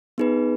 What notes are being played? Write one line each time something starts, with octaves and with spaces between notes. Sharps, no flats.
B3 D#4 G#4 B4